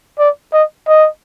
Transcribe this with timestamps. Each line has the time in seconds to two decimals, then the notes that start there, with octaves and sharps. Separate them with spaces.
0.19 D5
0.53 D#5
0.87 D#5